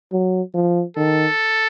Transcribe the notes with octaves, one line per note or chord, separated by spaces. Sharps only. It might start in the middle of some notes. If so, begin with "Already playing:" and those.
F#3
F3
D#3 A4